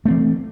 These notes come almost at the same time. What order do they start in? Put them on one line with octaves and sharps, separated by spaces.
A3 C4 E3